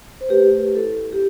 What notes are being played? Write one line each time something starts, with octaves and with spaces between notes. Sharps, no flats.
C5
A3 G4 B4
E4 A4
G4